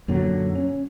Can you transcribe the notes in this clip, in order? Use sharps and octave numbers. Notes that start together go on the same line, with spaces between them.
F#2 A#2 D3 F#3
C#4